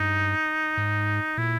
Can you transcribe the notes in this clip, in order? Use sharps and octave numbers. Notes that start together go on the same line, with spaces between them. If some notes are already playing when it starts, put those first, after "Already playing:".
Already playing: G2 D#4
G#2
A#2 E4